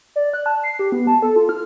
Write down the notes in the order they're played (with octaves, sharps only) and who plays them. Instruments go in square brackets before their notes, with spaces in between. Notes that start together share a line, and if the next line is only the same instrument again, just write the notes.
[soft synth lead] D5
F#6
A5
C7
G4
B3
A5
A4
F4
F6